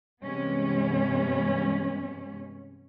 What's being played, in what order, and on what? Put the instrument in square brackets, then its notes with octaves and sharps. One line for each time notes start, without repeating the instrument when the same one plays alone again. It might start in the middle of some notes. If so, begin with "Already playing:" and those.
[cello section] G2 C3 E3 G#3 B3 C#4